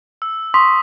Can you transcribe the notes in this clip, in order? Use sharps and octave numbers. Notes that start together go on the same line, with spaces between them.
E6
C6 C#6 D#6 B6